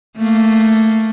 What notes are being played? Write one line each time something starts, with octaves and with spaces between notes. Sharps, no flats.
A3 A#3